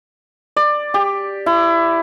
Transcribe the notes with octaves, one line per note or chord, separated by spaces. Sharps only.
D5
G4
E4